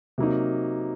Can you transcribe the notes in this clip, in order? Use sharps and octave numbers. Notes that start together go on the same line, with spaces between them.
C3 F#3 A#3 D#4